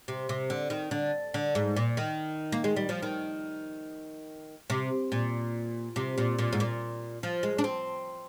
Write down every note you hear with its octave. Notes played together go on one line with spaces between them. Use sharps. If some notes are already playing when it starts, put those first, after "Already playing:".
C3
C3
D3
D#3
D3
D3
G#2
A#2
D#3
A#3
G#3
G3
F3
D#3
C3
A#2
C3
A#2
A#2
G#2
A#2
F3
G#3
D4
C4